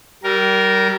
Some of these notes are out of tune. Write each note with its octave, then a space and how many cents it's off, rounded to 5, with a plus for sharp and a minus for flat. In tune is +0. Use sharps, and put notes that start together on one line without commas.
G3 -30 A#4 +0